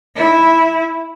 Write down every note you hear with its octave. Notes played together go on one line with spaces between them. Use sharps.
E4